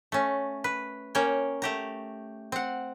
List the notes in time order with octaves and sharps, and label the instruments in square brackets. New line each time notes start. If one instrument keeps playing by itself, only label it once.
[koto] A3 C#4
B4
A#3 C#4 C#5 G5
A3 G4 A#5
C4 F#5